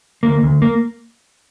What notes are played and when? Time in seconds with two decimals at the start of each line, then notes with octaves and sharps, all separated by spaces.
0.23 D2 A#3
0.43 D2
0.62 A#3